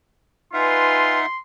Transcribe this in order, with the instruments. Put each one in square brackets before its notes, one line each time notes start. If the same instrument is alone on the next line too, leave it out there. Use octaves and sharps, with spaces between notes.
[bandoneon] D#4 E5 F#5 [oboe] F4 [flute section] B4 G#5 [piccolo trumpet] C6